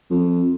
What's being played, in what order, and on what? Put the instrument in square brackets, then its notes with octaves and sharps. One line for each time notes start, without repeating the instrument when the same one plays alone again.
[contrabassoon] F2